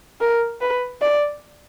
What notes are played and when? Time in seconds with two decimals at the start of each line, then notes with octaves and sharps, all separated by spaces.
0.21 A#4
0.61 B4
1.02 D5